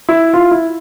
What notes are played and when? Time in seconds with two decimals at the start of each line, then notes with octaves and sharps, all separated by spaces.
0.09 E4
0.33 F4
0.51 E4